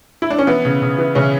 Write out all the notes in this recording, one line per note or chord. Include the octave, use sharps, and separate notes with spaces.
E4
D4
C#4
E3 B3
C#3
C#3
E3
C#3 E3 C#4